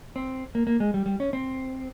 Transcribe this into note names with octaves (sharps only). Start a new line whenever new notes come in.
C4
A#3
A#3
G#3
G3
G3
C#4
C4